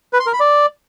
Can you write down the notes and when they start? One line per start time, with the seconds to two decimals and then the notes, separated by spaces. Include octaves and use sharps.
0.13 B4
0.20 C6
0.26 A#4
0.33 B5
0.40 D5